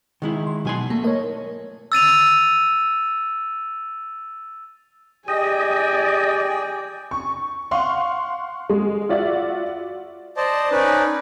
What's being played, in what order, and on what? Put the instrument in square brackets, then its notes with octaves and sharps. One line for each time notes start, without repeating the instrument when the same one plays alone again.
[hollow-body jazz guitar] D#3 G#3 E4
[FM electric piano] C6
[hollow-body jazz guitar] B2 G#5 C6 [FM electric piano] F#3 D#4
[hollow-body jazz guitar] A3 [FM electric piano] A#3
[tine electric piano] A#4 C#5 [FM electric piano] D#5
[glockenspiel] E6 A6 D#7 F7
[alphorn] G4 [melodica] G#4 G5 [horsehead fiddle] D5 G#5 [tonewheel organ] D#5
[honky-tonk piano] C#6
F5 F#5 C6 C#6
G#3
F4 F#4 D5 E5 F#5
[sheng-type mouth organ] C5 D5 D#5 A5
C#4 D#4 B4 D5